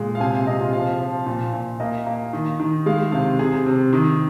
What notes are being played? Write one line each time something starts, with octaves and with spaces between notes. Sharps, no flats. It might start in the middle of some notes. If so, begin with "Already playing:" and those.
Already playing: A#2 G#3
F5
C3 G#5
F5
C3 D#5
F4
F3 F5
F3
A#2
A#2
A#3 D#5
A#3
D#3
D#3
G#3 F5
C3 F5
C3 G#4
C3
D#3